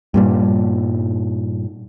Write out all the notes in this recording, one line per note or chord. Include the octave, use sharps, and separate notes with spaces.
G2 A#2 G3